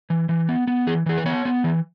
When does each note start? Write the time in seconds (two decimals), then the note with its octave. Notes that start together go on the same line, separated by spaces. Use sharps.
0.10 E3
0.29 E3
0.49 B3
0.67 B3
0.87 E3 G#4
1.06 E3 G#4
1.18 B4
1.25 B3 C#5
1.45 B3
1.64 E3